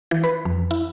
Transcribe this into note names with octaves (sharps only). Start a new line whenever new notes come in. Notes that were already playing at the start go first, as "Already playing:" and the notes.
E3
B4
F2
E4